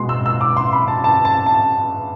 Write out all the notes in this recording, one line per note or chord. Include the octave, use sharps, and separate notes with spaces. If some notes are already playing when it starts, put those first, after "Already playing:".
Already playing: B2 G#3 C6
E6
E6
D6
C6
B5
A5
A5
A5
A5